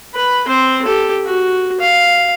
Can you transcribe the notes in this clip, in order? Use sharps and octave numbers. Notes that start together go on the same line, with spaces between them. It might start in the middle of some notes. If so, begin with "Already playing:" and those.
B4 B5
C4 C5
G4 A4
F#4
F5